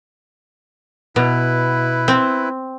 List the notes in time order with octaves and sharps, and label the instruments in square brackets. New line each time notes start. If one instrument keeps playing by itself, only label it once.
[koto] B2 [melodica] E4 B4
[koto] C4